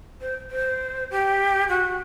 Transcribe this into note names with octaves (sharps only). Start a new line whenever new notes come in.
C5
C5
G4
F#4